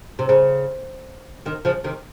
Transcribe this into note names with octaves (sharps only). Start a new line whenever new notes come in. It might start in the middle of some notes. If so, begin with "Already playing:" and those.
C3
C#3
C3 D#3
C#3 F3
C3 D#3